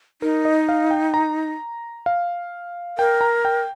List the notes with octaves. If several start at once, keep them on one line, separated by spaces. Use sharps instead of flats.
D#4 A#4
D#5
F5
G5
A#5
F5
A#4 G5
A#5
G5